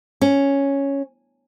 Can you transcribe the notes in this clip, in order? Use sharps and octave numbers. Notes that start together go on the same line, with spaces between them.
C#4